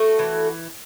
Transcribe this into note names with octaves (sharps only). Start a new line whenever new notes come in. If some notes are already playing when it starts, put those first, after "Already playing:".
Already playing: A3 F#4 A4
E3